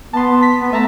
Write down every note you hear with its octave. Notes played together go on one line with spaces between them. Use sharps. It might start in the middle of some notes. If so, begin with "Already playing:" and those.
B3 A5 C6
B6
B3
A3 E5 A5 A#5